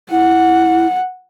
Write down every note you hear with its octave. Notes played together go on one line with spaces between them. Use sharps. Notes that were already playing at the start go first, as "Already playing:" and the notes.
E4 F#5